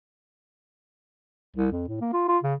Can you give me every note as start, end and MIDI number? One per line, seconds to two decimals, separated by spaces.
1.56 1.70 36
1.72 1.83 41
1.88 2.00 45
2.01 2.09 58
2.13 2.26 65
2.28 2.38 65
2.43 2.55 49